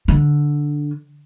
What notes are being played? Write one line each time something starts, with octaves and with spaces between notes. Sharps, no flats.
D3